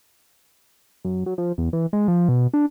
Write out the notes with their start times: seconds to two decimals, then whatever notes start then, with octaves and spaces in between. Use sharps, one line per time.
1.05 F#2
1.26 F#3
1.38 F3
1.58 E2
1.73 E3
1.93 G#3
2.08 F3
2.29 B2
2.54 D4